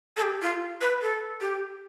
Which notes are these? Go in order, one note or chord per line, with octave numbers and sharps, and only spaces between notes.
A4
G4
F4
B4
A4
G4